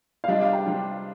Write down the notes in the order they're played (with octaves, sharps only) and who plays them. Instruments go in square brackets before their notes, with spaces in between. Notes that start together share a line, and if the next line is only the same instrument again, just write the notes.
[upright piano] F5
[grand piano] C3 G3 D4 F4 [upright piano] D#5
[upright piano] F5
G5
[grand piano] C3 G3 D4 F4